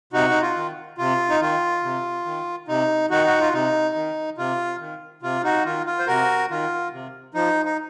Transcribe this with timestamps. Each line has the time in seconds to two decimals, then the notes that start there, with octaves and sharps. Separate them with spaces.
0.13 C3 D#4 F#4
0.30 D#4
0.42 F4
0.56 D#3
0.98 C3 F4
1.30 D#4
1.41 D#3 F4
1.83 C3
2.25 D#3
2.68 C3 D#4
3.10 D#3 D#4 F#4
3.27 F#4
3.41 F4
3.53 C3 D#4
3.95 D#3
4.37 C3 F4
4.80 D#3
5.22 C3 F4
5.44 D#4 F#4
5.65 D#3 F4
5.86 F4
5.99 C5
6.07 C3 F#4 A#4
6.50 D#3 F4
6.92 C3
7.34 F3 D#4
7.65 D#4